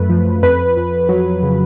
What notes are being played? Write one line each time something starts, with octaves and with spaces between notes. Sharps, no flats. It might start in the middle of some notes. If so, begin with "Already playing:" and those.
Already playing: F#2 A3 B4
F3
F2 B4
F2
F#3
C#3